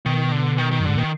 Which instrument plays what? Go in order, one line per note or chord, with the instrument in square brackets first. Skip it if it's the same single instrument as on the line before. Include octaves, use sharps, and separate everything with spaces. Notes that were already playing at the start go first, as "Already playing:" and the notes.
[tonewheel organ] B2 [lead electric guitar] D#3
[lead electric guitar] D3
D#3
D#3
[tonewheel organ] F#2
[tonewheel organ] G#2 [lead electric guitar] D3
[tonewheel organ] A#2 [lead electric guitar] D#3